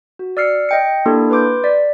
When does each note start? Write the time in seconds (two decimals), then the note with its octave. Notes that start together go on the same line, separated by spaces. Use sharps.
0.19 F#4
0.37 D5 E6 F6 C7 C#7
0.69 D#5 G5 C#7
1.06 A#3 D4 E4 G4 A4 A#4
1.30 B4 C6 D6 G6
1.64 D5 B6